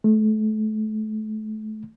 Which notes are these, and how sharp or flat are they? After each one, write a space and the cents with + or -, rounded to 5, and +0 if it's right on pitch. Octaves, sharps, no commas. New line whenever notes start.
A3 -30